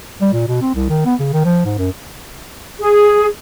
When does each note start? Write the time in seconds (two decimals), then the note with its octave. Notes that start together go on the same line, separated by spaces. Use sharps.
0.21 G3
0.33 A#2
0.48 B2
0.62 C4
0.75 C2
0.89 D#3
1.06 B3
1.20 C#3
1.33 D#3
1.45 F3
1.65 G#2
1.78 F#2
2.79 G#4